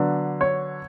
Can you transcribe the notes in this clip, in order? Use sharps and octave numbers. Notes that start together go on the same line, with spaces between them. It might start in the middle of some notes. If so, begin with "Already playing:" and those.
Already playing: D3 F#3 B3 D4
C#5